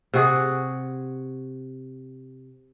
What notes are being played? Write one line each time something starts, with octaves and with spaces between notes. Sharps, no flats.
C3 F#4 G#4